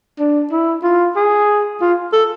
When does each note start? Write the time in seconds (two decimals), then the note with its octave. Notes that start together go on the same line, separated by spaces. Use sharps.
0.19 D4
0.51 E4
0.83 F4
1.16 G#4
1.81 F4
2.12 A4